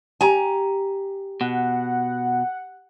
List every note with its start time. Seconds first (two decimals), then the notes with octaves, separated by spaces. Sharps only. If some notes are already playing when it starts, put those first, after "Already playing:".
0.21 G4 G#5 A#5
1.41 B2 F#5